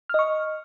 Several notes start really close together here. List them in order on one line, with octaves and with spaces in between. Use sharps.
F6 D#5 C#6